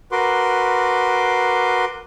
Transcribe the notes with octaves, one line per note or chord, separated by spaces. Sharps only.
F#4 A#4 B4 C6 D6